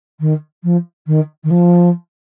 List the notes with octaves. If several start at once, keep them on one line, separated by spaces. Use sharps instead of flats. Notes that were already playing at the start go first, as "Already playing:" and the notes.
D#3
F3
D#3
D#3
F3